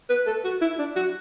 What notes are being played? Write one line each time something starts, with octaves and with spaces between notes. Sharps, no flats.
B4
A4
F#4
E4
D4
F#4